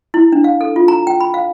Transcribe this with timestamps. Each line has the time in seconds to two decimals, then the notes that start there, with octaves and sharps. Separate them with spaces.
0.14 E4
0.32 D4
0.44 F5
0.61 A4
0.76 F4
0.88 A#5
1.07 G5
1.20 B5
1.34 F5